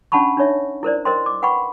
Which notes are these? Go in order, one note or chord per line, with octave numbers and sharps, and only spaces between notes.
C#4 D4 F#5 A5 B5 C#6
D4 D#4 C#5 E5
E4 A#4 C5 D5
A#4 C5 D#5 G5 C6
D6
B4 F#5 G5 B5 C#6